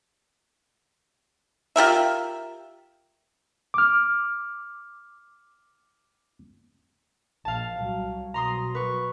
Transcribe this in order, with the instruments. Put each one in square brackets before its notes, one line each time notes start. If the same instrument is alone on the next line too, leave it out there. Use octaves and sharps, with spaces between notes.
[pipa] F4 G4 A#4 E5
[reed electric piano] D6 F6
[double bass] A#1 [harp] F5 A5
[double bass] C2 F#3
[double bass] B2 F#3 [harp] A#5 C6 D#6
[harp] B4 C#6